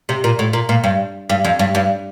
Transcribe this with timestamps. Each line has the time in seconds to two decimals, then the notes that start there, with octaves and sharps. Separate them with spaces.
0.09 C3
0.24 A#2
0.39 A2
0.53 A#2
0.69 A#2
0.84 G2
1.29 G2
1.45 F2
1.59 G2
1.75 G2